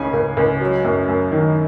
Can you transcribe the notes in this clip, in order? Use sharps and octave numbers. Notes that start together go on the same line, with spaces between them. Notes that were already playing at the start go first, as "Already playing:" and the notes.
Already playing: C#2 C#3 G#5
C#2
C#2
F#3
F#2
F#2
D#3